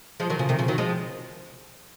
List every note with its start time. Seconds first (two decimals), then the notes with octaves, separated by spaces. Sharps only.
0.20 F3 G#3
0.30 D#3 F#3
0.39 C#3 F3
0.49 C3 D#3
0.59 C#3 F3
0.68 D#3 F#3
0.78 F3 G#3